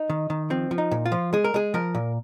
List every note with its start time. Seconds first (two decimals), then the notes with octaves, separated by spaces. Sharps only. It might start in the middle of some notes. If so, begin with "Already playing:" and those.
Already playing: D#4
0.10 D#3
0.30 D#3
0.50 F3 C4
0.71 F3
0.78 D#4
0.91 A#2
1.06 F4
1.12 F3
1.33 G#3 G#4
1.44 A#4
1.54 G#3 G#4
1.74 F3 A#4
1.95 A#2